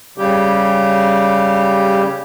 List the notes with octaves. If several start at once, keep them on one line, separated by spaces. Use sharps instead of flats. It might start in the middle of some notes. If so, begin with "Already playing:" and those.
C#3 G3 G4